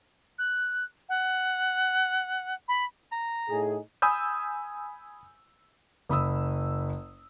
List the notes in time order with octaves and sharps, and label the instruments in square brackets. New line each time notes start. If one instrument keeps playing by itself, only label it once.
[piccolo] F#6
F#5
B5
[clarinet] A#5
[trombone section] A2 D#4 G#4
[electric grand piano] G#5 B5 D#6 E6 G6
[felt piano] F#1 B5 D#6 E6